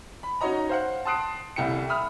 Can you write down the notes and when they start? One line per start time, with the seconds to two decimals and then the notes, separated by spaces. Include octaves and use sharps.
0.23 B5
0.41 C#4 D#4 F#4 C#5 D#5 A#5
0.69 C5 F5 F#5
1.05 A5 C6 D#6 F#6 C7 D7
1.56 D#1 C2 E4 G5 C#7
1.89 E5 B5 D#6 F6